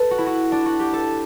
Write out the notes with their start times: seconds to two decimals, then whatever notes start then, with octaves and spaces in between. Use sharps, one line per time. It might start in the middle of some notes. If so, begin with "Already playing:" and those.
Already playing: A4 B4
0.11 F#4
0.18 E4
0.26 F#4
0.52 D4
0.66 F#4
0.80 G4
0.93 A4